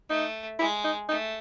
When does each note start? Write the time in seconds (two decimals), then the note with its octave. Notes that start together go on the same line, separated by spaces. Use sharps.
0.10 A3 D#4
0.59 G#3 E4
0.84 D#4
1.09 A3 D#4